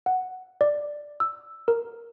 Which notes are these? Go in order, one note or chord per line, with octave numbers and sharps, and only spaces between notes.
F#5
D5
E6
A#4